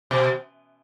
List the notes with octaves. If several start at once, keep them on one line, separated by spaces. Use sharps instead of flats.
B2